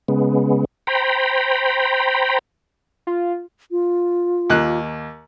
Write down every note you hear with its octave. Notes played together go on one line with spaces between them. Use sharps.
C#3 G#3 B3
C5 G5 A#5 B5
F4
F4
D#2 A#3 F#6